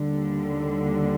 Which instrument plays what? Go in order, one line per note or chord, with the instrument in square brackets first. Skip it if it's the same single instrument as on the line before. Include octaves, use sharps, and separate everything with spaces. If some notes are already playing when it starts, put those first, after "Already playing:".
Already playing: [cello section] D#2 D3 G3